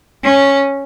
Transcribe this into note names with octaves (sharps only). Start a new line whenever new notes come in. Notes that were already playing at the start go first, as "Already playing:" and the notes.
C#4